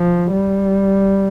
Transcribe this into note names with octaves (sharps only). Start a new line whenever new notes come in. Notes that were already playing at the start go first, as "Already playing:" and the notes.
Already playing: F3
G3